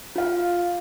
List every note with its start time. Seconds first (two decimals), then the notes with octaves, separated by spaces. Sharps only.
0.16 F4 F5